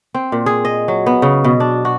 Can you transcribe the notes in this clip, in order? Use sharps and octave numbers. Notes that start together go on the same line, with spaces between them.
C4
A#2
G#4
D#5
F#3
B3
C#3
B2
D4
F#4